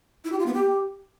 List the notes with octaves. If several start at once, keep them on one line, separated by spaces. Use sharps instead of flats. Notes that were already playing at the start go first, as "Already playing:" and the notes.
E4
G4
F4
B3
G4